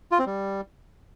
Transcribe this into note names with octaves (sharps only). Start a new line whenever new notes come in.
F4
C4
G3